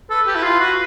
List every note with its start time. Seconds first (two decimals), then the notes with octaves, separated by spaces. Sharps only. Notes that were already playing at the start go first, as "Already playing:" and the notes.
0.10 A4 B4
0.27 G4
0.36 E4
0.44 F4
0.60 F#4